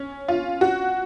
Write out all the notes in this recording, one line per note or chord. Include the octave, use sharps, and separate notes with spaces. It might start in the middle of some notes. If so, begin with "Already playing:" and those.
Already playing: C#4
F4
F#4